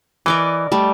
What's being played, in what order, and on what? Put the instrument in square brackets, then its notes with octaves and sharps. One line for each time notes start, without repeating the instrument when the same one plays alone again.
[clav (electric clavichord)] E3 [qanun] A#4 D5 D#5
[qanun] G3 A3